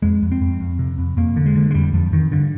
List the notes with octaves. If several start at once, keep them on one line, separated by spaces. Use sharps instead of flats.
F2 G#3
F2
C4
F2
F2
C3
F2
F2 A#3
D3
G#3
D3
G#3
F2 G3
F2 F3
F2 D#3
G2 D3